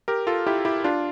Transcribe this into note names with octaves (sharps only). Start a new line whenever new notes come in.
G4 A#4
F4 A4
E4 G4
E4 G4
D4 F4